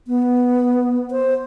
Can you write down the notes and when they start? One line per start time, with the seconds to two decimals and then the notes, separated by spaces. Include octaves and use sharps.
0.08 B3
1.11 C5